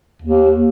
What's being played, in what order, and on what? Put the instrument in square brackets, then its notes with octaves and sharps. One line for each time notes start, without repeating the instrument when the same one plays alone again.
[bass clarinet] D#2